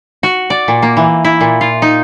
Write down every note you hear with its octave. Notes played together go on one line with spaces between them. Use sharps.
F#4
D5
A#2
A#3
E3
E4
A#2
F4
D#4